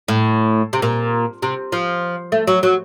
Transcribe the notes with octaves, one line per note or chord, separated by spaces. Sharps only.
A2
C3
A#2
C3
F3
A3
F#3
F#3